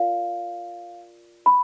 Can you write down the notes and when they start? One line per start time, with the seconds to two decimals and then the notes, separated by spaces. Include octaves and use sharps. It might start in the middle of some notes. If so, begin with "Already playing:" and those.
Already playing: F4 A#4 D5 F5
1.46 B5